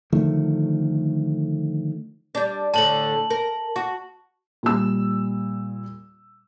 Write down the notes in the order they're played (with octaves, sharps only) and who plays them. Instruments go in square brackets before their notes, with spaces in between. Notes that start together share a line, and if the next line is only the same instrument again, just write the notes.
[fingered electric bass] D3 D#3 F3 A3
[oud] G3 D4
[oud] A2 D3 [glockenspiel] A5 F#7
[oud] A#4
F#4
[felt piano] A#2 G3 E6